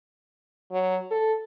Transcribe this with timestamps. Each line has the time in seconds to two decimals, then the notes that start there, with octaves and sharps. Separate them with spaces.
0.72 F#3
1.11 A4